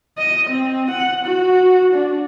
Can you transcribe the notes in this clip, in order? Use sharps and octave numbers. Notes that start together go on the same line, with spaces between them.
D#5
C4
F#5
F#4
D4